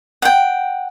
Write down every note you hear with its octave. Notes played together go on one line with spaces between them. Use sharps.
F#5 G5